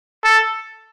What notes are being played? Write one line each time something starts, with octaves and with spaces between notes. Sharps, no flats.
A4